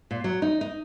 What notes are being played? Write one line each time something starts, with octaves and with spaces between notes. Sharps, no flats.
A#2
F#3
D#4
D#4